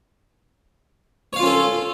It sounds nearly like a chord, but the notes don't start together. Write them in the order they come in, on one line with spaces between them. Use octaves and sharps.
C#5 F5 F4 C#4 A4